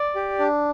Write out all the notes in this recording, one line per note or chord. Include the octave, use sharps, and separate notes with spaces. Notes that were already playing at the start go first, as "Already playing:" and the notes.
Already playing: D5
G4
D4